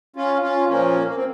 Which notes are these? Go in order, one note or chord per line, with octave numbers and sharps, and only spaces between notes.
C#4 F4
C#4 F4
A#2 F3 A#3 C#4
A#3
C4